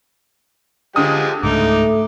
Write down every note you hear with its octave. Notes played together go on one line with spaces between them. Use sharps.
D3 F3 G#3 G4 D#6
C#2 G#2 A3 D#4 D6